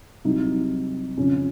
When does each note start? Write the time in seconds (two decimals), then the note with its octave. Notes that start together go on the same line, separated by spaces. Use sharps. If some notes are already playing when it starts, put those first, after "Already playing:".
0.24 C2 C3 F#3 D#4
1.17 F2 C#3 F3 C#4